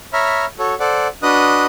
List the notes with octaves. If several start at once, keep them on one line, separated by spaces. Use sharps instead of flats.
C#5 E5 A#5 B5 F6
F#4 A4 C#5
A4 C5 D5 F#5
D4 F#4 B4 D#5 D#6 F#6